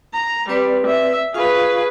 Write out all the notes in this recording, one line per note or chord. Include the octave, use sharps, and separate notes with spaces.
A#5
G3 C4 B4 D5
E5
F4 G#4 B4 F5 C#6